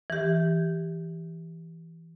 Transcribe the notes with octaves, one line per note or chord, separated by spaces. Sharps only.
E3 G4